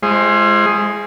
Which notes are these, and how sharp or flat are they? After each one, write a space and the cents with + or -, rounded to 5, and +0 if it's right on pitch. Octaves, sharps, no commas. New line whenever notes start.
G#3 +0 E4 +45 C5 +20